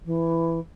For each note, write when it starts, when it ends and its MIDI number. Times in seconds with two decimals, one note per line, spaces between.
0.05 0.60 52